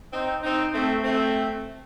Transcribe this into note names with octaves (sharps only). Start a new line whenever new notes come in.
C4 D#4
C4 D#4
A3 C4
A3 C4